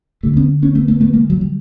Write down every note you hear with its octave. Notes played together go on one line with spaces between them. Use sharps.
D2 D3 G3 A3
B3 C#4
B3 C#4
A3 B3
A3 B3
A3 B3
G#3 A#3
F#3
G3